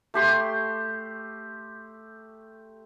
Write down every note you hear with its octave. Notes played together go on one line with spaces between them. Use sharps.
A3 G4 C6